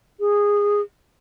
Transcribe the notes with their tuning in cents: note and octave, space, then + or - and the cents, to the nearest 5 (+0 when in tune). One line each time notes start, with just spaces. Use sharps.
G#4 -15